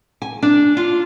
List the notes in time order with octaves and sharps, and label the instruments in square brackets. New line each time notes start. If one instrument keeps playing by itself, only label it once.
[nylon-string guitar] G#5
D4
F4